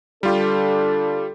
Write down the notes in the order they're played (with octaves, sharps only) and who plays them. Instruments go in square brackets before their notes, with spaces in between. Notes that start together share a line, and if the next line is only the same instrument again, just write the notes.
[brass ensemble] D3 D4 A4 [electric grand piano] G3 F4 G4